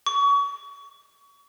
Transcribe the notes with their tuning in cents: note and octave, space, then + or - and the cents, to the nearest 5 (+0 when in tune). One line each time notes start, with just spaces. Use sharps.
C#6 +30